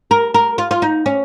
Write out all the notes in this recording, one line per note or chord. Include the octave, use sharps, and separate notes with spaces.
A#4
A#4
F4
F4
D#4
C#4